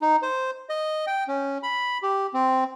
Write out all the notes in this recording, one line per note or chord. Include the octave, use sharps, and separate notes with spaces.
D#4
C5
D#5
G5
C#4
B5
G4
C4